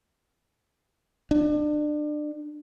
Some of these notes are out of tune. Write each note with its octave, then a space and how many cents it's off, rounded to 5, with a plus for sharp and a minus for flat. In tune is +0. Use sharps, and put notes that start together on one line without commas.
D4 +30